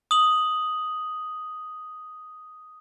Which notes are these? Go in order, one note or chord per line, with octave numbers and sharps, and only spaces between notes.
D#6 F#7